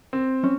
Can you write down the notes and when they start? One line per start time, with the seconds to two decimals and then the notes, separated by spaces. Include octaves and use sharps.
0.13 C4
0.43 C#4